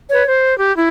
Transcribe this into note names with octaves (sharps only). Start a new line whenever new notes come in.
B4 C#5
C5
G4
E4